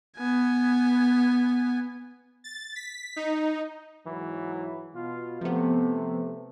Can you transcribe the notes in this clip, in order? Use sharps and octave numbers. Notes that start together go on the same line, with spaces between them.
B3 G#5
A6
B6
D#4
G#2 E3 F#3
B2 F4
C3 F3 A3 B3